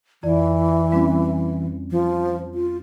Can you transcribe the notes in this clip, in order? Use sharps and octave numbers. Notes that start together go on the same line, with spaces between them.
F2 E3 D5
G3 C4 C#4
F3
F4